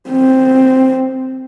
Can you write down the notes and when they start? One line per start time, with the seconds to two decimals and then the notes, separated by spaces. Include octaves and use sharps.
0.10 C4